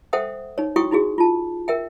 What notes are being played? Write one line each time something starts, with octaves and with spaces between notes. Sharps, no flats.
A4 C5 E5 F#5 G5 D#6
D#4 C#5
E4 F#4 G5 C#6 D#6
D#4 E4 F#4 G#4
F4 A5
A#4 E5 G5